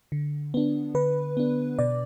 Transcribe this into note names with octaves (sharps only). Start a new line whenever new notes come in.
D3
B3 D4
D3 B4
B3 D4
B2 D5